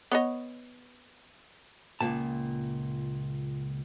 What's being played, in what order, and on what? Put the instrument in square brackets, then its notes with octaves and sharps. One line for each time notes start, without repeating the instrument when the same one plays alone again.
[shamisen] B3 C#5 D#5
[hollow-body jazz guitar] C#2 A#2 A5